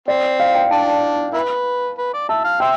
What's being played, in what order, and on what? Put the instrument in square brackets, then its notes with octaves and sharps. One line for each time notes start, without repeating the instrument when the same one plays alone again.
[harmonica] C4 [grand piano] D5
[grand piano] F5
G5
[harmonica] D4 [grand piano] A5
[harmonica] E4 B4
B4
D5
[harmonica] E5 [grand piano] A5
[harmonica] F5
[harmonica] C5 E5 [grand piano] G5